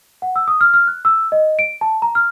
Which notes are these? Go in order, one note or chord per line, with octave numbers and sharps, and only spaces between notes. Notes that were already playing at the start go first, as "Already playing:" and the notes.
F#5
E6
D#6
F6
F6
F#6
E6
D#5
D7
A5
A#5
F6